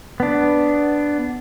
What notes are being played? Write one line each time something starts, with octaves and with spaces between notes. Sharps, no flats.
B3 D4